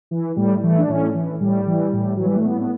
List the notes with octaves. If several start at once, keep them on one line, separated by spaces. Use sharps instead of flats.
E3
A2 G3
E3 A3
D4
A2 C#4
E3
A2 G3
E3
A2
E3 F#3
G3
A3
A2 B3
B3